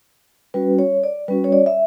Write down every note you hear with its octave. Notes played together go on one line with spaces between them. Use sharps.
G3 C#4 F#4 B4
C#5
D5
G3 C#4 F#4 B4
C#5
D5
E5